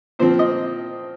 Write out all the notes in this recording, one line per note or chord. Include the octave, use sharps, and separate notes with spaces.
A#2 F3 C4 C5
D#5